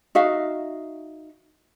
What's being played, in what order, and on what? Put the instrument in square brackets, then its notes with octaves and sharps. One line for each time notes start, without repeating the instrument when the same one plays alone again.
[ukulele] D#4 F#4 E5 F5